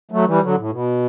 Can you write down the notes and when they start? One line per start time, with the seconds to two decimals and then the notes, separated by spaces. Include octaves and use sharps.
0.11 F#3 A3
0.27 E3 G3
0.42 D3 F#3
0.57 A2
0.71 B2